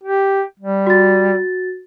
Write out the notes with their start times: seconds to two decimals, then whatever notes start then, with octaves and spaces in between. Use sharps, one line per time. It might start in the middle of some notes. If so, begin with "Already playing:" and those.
0.03 G4
0.60 G3
0.87 F#4 A6